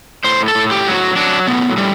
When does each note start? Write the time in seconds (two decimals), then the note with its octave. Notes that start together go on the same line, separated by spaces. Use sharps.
0.24 A2 C5
0.48 A4
0.55 A2
0.71 G4
0.87 F#3
0.94 F#4
1.16 F#3 D4
1.47 A2 B3
1.77 A2 G3